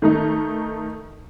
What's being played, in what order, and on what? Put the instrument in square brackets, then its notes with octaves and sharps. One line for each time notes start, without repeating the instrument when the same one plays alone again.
[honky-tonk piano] D#3 A3 D#4